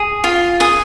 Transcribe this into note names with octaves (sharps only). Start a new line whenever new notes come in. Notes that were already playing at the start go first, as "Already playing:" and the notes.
Already playing: G#4
F4
G#4 D#6